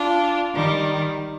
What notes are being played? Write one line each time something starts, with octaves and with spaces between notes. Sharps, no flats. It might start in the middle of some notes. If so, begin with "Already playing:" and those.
Already playing: D4 F4
D#3 G3